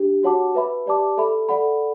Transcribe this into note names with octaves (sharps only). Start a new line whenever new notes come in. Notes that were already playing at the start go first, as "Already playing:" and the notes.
Already playing: D4 G4
F#4 C#5 F#5 A5 D6
B4 E5 B5
G4 D5 A5 D6
A4 E5 B5
A4 D5 F#5 B5